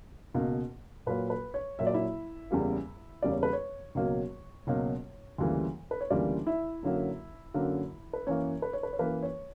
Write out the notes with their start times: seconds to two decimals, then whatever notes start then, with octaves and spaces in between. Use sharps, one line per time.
0.34 C#2 B2 A#3
1.06 A#2 F#3 A#3 B4
1.30 B4
1.54 C#5
1.79 A#2 F#3 A#3 E5
1.87 D5
1.94 E4 E5
2.51 E2 C#3 G3 A#3
3.22 E2 C#3 G3 A#3 D5
3.32 C#5
3.43 B4
3.53 C#5
3.95 C#2 B2 F#3 A#3
4.67 C#2 B2 F#3 A#3
5.38 D2 C#3 E3 G3 A#3
5.91 B4
6.01 C#5
6.10 D2 C#3 E3 G3 A#3 D4 D5
6.47 E4 E5
6.83 F#2 D3 F#3 A#3
7.54 F#2 D3 F#3 A#3
8.13 B4
8.27 F#2 E3 A#3 C#5
8.62 B4
8.73 C#5
8.83 B4
8.93 C#5
8.99 F#2 E3 A#3 B4
9.23 C#5